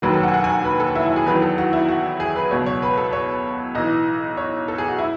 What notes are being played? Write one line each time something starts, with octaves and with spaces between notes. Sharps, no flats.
E1 D#2 D#3 F#3 B4
A4
F#5
G#5
F#5
G#5
F#5
B4
A4
E4
E4
G#4
E2 D#3 F#3 B4
A4
F#4
E4
F#4
G#4
B4
C#2 B2 F#3 C#5
C#5
B4
A4
C#5
B1 A2 E3 D#5
C#5
A4
G#4
F#4
E4